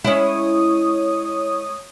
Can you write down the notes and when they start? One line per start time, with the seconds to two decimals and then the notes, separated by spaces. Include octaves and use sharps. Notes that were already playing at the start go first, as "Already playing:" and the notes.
0.04 G#3 C#4 E4 C#5 D#6